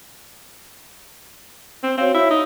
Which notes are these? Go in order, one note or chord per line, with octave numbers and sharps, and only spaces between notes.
C4
C4 F#4 C#5 F5
E4
D#4